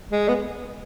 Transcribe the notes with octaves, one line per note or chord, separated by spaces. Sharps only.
G#3
B3